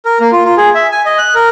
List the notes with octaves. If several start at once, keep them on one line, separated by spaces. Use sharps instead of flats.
A#4
A#3
F4
F4
G#4
E5
G#5
D#5
F#6
A#4